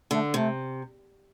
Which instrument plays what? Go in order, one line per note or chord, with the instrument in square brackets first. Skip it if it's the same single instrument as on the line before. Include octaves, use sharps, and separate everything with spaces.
[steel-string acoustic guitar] D3 [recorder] A3
[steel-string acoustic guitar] C3 [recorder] A3